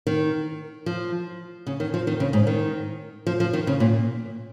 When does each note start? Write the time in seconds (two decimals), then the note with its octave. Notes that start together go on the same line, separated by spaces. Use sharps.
0.07 D#3
0.86 F3
1.67 C#3
1.80 D#3
1.94 F3
2.07 D#3
2.20 C#3
2.33 G#2
2.47 D#3
3.27 F3
3.40 F3
3.53 D#3
3.67 C#3
3.80 A#2